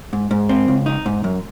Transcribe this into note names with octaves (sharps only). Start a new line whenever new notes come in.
G#2
G#2
C4
C#2
D#4
G#2
F#2